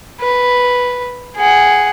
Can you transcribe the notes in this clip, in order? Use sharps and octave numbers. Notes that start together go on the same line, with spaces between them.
B4
G#4 F#5